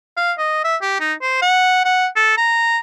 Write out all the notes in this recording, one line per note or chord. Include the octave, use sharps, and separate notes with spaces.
F5
D#5
E5
G4
D#4
C5
F#5
F#5
A4
A#5